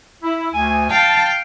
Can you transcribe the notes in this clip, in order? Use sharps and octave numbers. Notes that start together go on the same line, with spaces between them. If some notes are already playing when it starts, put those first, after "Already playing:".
E4
D2 G#5
F5 G5 A5